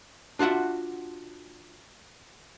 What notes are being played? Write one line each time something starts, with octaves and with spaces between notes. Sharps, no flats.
D4 F4 F#4 E5 F#5